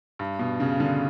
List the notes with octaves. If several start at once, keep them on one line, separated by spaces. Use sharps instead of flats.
G2
B2
C#3
D3